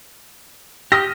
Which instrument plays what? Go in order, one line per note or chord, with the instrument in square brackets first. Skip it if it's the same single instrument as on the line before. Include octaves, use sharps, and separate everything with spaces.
[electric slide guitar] G4 [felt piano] D#6 F6 A#6